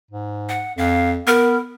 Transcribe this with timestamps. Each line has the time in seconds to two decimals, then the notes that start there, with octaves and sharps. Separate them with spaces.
0.11 G#2
0.49 F#5
0.78 F2 F5
1.27 B3 A#4